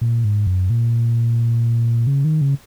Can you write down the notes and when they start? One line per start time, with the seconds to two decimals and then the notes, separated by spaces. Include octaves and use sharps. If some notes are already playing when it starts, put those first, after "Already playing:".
0.01 A#2
0.24 G#2
0.47 F#2
0.70 A#2
2.07 C#3
2.24 D#3
2.41 C#3